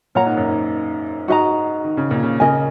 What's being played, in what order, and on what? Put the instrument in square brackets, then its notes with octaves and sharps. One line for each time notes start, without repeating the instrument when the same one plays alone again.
[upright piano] A#2 [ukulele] A#4 C#5 F#5 A#5
[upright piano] G#2
F#2
G#2
[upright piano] G#2 [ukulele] F#4 D#5 A#5
[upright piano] D#3
C#3
A#2
C#3
[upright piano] C#3 [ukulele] A#4 D#5 G#5